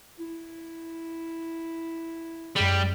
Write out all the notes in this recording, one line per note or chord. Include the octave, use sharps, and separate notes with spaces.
E4
F#2 G3 G#3